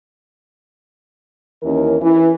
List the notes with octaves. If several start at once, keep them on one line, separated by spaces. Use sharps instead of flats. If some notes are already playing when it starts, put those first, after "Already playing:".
D#2 E3 C#4 A#4
E3